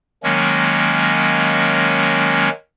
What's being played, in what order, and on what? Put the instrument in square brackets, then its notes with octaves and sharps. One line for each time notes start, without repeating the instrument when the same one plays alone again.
[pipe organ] D#3 F#3 G#3 A#3 C#4